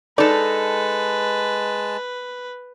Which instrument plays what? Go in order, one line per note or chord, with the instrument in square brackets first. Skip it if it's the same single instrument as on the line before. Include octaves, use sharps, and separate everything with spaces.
[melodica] G#3 A5 [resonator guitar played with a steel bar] D#4 A4 [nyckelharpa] B4 [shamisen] D5